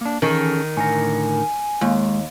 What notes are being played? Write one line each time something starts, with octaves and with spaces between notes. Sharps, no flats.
A#3 D4
D#3 E3 C#4 G#4 A4
A2 D3 A#4 G#5
D#2 G#3